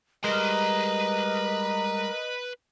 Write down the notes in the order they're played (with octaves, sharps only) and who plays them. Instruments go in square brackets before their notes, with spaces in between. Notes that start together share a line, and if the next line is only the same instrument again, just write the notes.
[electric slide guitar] G3 G#3 [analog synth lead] A#4 [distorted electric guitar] B4 C6 [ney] D#5